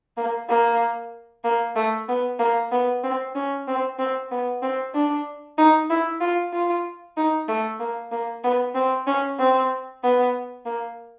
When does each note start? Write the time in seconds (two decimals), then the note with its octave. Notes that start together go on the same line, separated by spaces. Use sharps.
0.17 A#3
0.49 A#3
1.44 A#3
1.76 A3
2.09 B3
2.39 A#3
2.71 B3
3.04 C4
3.35 C#4
3.68 C4
3.99 C4
4.31 B3
4.62 C4
4.95 D4
5.58 D#4
5.90 E4
6.21 F4
6.53 F4
7.17 D#4
7.48 A3
7.80 A#3
8.12 A#3
8.44 B3
8.75 C4
9.07 C#4
9.39 C4
10.03 B3
10.66 A#3